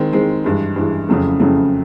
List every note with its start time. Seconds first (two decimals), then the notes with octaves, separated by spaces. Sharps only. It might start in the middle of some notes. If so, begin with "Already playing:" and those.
Already playing: D#3 G#3 C4
0.13 D#3 G#3 C4
0.44 G2 E3 G#3
0.76 G2 E3 G#3
1.09 F2 C#3 F#3 A3
1.39 F2 C#3 F#3 A3